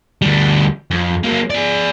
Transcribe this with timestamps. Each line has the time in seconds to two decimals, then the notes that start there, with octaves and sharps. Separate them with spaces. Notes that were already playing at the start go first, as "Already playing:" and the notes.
0.22 D2 G3
0.91 F2
1.24 F#3 A#3
1.50 G#4 D5